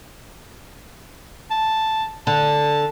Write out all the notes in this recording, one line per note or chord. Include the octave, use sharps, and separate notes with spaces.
A5
D3 A5